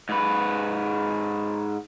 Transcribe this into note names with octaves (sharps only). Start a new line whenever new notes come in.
G#2 B4